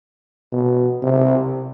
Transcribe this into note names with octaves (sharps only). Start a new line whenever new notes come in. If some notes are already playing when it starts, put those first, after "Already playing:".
B2
C3